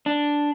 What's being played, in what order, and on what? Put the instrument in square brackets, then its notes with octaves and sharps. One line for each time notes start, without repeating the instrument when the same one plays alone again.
[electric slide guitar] D4